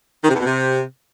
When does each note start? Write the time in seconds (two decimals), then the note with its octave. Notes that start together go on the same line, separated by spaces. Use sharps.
0.23 D#3
0.29 C3
0.34 E2
0.40 B2
0.45 C3